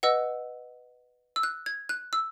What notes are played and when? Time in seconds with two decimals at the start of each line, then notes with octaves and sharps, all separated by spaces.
0.03 B4 D#5 F#5 E6
1.36 E6
1.43 F#6
1.66 G#6
1.89 F#6
2.13 E6